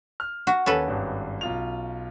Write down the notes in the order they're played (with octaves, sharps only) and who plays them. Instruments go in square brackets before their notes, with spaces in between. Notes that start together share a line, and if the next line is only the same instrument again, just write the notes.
[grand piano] F6
[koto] F#4
[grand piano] D#2 [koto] C#4 A4 B4
[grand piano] G#1 G2
B1 F4 F7